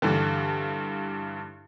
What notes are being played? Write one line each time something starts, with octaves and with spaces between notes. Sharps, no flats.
G2 D3 E3